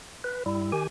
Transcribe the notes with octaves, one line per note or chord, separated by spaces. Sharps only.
B4
G2 G3 E4
D#3 G4 G#5